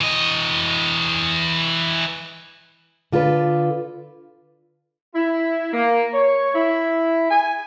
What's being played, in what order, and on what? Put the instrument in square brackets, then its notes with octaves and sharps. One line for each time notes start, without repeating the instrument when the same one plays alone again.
[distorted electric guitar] E3 D#5
[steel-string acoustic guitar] D3 F4 A4 B4
[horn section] E4
A#3
C#5
E4
G#5